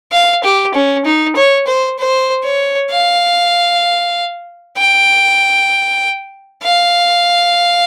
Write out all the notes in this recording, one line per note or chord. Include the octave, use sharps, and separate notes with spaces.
F5
G4
C#4
D#4
C#5
C5
C5
C#5
F5
G5
F5